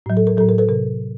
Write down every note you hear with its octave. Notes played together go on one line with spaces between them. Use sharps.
A2 F#3
A4
A#4
A2 F#3 A4
A#4
A4 B4
C3 A#4